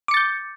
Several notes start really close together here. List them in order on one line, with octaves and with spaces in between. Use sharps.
D6 C#7 A6 G6